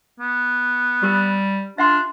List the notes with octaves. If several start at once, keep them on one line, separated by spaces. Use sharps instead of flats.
B3
G3 G4 A#4
D4 F4 E5 F#5 C6